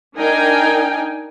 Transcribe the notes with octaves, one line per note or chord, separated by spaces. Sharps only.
D4 D#4 A#4 G5 G#5